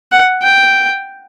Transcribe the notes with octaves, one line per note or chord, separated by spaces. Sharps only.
F#5
G5